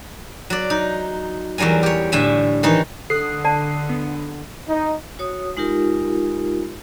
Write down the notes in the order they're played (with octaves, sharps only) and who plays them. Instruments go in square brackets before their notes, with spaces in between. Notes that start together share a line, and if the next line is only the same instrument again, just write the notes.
[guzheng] F#3 D5
D#4
E2 F#3 G3 A#4 G#5
G4 C#5
A2 D3 G3 E5 G#5
D#3 E3 D#4 C#5
[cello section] D3 [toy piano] A4 [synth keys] D#6 F#6 C7
[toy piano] D5 A5
[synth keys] B3
[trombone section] D#4
[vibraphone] F#4 C#5 D#6
G#3 D#4 F4 G4 A#4